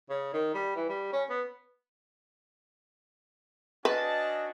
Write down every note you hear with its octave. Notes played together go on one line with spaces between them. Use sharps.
C#3
D#3
G3
E3
G3
C#4
B3
C#4 D4 F#4 B4 D#5 A5